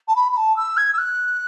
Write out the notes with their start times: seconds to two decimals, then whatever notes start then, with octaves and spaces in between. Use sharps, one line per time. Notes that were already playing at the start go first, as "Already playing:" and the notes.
0.08 A5
0.16 B5
0.32 B5
0.37 A5
0.57 E6
0.77 G#6
0.93 E6
0.98 F#6